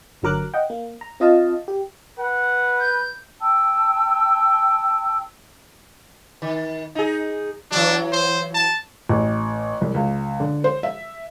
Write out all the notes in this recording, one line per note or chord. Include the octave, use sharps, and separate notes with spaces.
G1 D3 F#3 A#4 D6 F#6
D#5 F#5 G5
A#3
A#5
C4 F4 D#5 F5 A5
G4
B4 F#5
G6
G5 A5 E6
D#3
D#4 G#4
E3 F#3 D4
C5
A5
A1
C2
C#2
D3
C5
E5